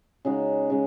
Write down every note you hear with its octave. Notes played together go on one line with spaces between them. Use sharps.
C#3 G#3 D#4 F#4
C#3 G#3